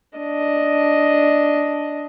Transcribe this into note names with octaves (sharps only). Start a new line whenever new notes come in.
D4 D#5